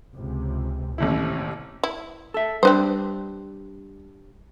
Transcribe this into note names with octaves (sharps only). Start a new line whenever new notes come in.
C#2 C3
A1 D#2 C3 E4
E4
A4 E5
G3 C4 D4 B4 C5